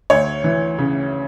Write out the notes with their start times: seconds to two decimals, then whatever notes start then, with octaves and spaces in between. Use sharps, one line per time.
0.10 D2 C#5
0.44 E3
0.78 C#3